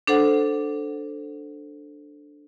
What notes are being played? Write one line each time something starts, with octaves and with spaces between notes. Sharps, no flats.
D4 A4 C5 F#5